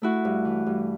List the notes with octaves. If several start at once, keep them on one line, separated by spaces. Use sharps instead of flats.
A3 E4 F#4
G2
E3
G2